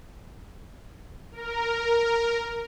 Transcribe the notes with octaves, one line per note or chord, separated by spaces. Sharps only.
A#4